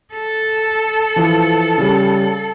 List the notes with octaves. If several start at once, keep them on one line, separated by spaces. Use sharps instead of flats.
A4
E3 F3
C#3 G3